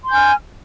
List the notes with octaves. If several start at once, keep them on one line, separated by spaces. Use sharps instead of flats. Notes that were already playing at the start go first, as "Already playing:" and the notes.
G#5 C6 F6 G6